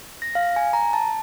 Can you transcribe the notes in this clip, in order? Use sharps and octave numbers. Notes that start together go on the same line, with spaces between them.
A#6
F5
G#5
A#5
A5